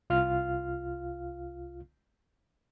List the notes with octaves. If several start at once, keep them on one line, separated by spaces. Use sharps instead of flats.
C2 F4 F5 F6